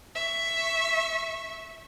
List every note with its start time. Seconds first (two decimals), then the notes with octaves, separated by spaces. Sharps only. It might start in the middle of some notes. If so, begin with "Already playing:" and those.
0.15 E5 C#6